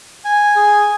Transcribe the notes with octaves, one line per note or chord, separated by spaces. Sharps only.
G#5
G#4